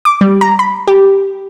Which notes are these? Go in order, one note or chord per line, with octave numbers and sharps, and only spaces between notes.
D6
G3
A#5
B5
G4